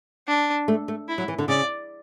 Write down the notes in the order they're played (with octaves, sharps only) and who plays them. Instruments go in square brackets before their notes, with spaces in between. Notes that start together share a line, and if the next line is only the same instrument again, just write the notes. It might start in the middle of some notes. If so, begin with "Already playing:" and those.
[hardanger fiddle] D4
[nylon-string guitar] A3
A3
[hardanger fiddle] E4
[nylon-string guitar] F#3
E3
D3
[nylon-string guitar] C#3 [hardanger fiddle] D5